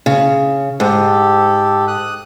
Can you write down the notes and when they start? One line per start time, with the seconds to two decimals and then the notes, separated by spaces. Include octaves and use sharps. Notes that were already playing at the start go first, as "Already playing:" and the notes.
0.06 C#3
0.80 G#2 G4 A4
1.88 D#6 F#6